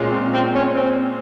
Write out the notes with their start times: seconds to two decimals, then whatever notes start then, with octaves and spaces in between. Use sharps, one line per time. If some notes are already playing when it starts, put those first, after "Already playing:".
Already playing: A#2 G#3 C#4 F4
0.10 C4
0.32 C4
0.53 C#4
0.74 C4